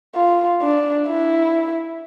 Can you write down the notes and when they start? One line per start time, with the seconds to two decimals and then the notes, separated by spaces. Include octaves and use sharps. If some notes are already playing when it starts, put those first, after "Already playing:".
0.16 F4
0.62 D4
1.08 E4